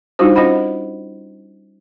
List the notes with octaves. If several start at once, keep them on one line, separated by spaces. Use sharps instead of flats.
G3 D4 D#4 F4 F#4 C5
C#4 F4 C5 D#5 F#5 B5